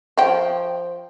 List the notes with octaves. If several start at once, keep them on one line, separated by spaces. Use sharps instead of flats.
F3 G5